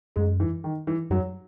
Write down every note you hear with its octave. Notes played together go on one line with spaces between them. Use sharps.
F#2 G#3
E3
D#3
E3
F#2 F#3